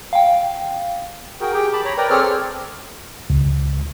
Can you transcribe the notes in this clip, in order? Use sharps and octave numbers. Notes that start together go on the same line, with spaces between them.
F5 G5
F#4 G#4 A#4 G5
G4 G#4 G5
A5 B5 D6
C#5 A#5 B5
A#4 B4 D5 G5 A#5
C4 G#4 A4 C#5 D5 F6
C#2